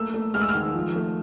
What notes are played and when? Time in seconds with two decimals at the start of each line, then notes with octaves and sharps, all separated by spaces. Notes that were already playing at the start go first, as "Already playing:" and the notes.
Already playing: A3 A#3 E6
0.14 A3
0.34 G#3 F6
0.41 E6
0.49 F6
0.55 D#3
0.74 F3
0.96 A3